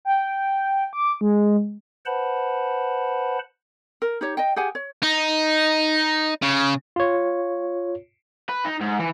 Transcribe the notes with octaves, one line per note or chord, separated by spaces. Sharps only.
G5
D6
G#3
B4 C5 F#5 A5 B5
A#4
D#4 G4 C#5
D#5 G5
G4 G#4 F#5 G#5
C#5
D#4
C#3
F4 C#5
B4
D#4
G#2
E3